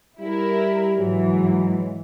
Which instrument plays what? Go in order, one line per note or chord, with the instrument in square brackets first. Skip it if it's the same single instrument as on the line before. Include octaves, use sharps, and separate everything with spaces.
[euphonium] G3 [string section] E4 A#4
[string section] G#2 E3 [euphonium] F#3